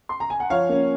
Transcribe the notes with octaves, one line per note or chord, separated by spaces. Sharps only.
C6
A#5
G#5
F#5
F3 C#5 F5
A#3 C#4